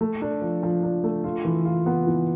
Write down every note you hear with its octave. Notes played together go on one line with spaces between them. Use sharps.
A3
D4
F3
F3
D4
A3
F4
E3
F4
B3
E3